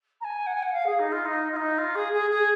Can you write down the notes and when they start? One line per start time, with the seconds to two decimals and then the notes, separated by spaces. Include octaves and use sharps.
0.21 A#5
0.24 G#5
0.46 F#5
0.54 G#5
0.62 F#5
0.72 F5
0.86 G#4
0.99 D#4
1.12 F4
1.25 D#4
1.52 F4
1.56 D#4
1.78 F4
1.95 G#4
2.12 G#4
2.30 G#4